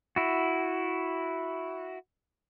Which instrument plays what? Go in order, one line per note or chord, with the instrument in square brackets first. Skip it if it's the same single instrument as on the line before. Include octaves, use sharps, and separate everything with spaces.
[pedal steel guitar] E4 F#4